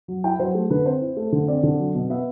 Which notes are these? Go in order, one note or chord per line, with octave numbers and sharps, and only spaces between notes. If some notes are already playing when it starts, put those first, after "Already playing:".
F#3
E4 G5
F#3 C5
A3 A4
D3 B4
C4 C5
E4
A3
D3
C4 D5
D3
F#3
B2
B3 E5